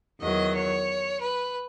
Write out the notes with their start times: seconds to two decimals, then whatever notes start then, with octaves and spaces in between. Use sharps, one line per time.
0.21 E2 D#3 F#3 D#5
0.55 C#5
1.21 B4